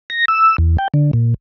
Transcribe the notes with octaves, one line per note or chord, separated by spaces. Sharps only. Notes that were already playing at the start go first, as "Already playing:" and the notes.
A#6
E6
E2
G5
D3
A#2